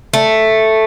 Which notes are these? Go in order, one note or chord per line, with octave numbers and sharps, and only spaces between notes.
A3